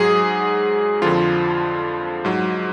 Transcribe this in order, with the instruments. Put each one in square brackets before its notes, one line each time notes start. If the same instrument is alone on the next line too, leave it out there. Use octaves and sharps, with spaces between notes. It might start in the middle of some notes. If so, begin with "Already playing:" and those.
Already playing: [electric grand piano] G#2 F#3 G#4
F2 D3 F3 F4
G#2 F#3